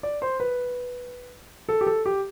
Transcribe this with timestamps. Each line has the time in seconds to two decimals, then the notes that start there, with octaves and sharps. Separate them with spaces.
0.03 D5
0.22 C5
0.40 B4
1.69 A4
1.81 G4
1.87 A4
2.06 G4